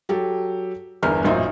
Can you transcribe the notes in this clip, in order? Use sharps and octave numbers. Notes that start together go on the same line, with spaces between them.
F#3 G4 A4
G1 E2 A#4 F6
A1 F#2 A#2 D#4 C5 E5